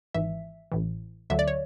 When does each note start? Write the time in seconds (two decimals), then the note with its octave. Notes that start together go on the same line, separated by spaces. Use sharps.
0.14 G#1 G#2 E3 E5
0.72 A1 A2 E3
1.30 D2 D3 F#3 E5
1.39 D5
1.48 C#5